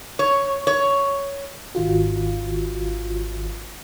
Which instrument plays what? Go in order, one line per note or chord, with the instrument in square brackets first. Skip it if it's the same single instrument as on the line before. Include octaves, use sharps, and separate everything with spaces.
[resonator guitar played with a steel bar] C#5
C#5
[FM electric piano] G#1 D#3 F4 F#4